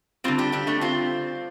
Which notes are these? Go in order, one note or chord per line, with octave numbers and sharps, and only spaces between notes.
D3 G3 C4 F4
D4 G4
D4 G4
A3 D4
C4 F4